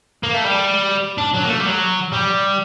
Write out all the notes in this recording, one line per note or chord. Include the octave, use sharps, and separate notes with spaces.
A#3
A3
G3
D4
F#3
A#3
A3
G3
F#3
G3